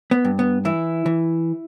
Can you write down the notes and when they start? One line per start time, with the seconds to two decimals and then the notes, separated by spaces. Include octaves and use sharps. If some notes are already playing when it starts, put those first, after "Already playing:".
0.11 B3
0.25 G2
0.39 B3
0.65 E3 E4
1.06 E3